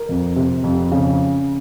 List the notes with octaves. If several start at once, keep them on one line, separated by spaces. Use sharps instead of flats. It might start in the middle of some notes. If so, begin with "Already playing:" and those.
Already playing: A#4
F2
C3
F2
C#3